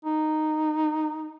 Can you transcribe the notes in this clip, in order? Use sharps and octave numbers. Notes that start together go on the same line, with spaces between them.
D#4